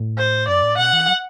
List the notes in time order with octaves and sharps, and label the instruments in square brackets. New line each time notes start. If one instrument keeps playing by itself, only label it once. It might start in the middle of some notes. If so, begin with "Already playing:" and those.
Already playing: [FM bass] A2
[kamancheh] C5
[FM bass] F#2 [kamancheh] D5
[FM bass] A2
[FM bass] B2 [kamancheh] F#5
[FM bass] E3
F#3